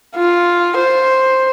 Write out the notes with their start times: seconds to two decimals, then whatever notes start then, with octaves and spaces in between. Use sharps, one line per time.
0.16 F4
0.77 C5